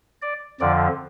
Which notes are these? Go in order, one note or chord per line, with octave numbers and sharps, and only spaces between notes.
D5
F2 D3 F3 D5